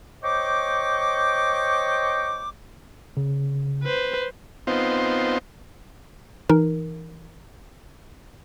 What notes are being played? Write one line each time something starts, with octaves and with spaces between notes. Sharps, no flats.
C5 C#5 D#5 G5 C#6 D6
C#3
B4 C5
B3 C4 D#4 F4 C5
E3 D#4 A#4